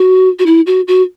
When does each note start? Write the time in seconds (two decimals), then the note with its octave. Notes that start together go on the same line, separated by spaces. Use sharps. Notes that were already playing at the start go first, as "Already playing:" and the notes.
Already playing: F#4
0.39 F#4
0.46 E4
0.66 F#4
0.87 F#4